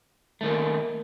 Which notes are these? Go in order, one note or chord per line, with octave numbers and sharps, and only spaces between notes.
D#3 A3 A#3